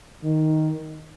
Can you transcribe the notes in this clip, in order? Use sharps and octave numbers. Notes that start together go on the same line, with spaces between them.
D#3